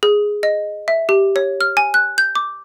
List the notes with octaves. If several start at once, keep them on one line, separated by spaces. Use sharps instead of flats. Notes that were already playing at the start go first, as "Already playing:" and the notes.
G#4
D#5
E5
G4
C#5
F6
G#5
F#6
G6
D6